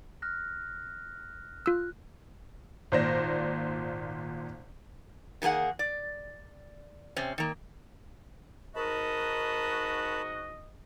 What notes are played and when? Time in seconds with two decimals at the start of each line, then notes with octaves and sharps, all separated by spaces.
0.22 F6 F#6 A#6
1.66 F4 E6 F#6
2.92 G#1 A#2 C5 D5 A#6 E7
5.42 D#3 G#3 A#3 G#4 F#5
5.79 D5
7.16 C3 C4 C#4
7.38 D#3 A#3
8.76 G#2 D#4 F#4 A#4 D#5 A5 B5